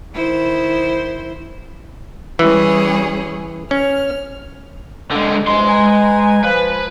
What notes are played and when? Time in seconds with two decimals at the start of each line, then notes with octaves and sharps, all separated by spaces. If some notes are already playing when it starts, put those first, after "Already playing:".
0.13 D#3 E4 C5
2.39 E3 G3 C#4 G#4
3.71 C#4 F6
5.11 D3 G#3
5.47 E2 C3 G#3 C6
5.68 B4 G#5 A#5
6.44 F3 B4